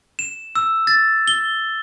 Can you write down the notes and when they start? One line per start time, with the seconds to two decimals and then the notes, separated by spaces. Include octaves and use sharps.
0.19 E7
0.55 E6
0.87 A6
1.28 G7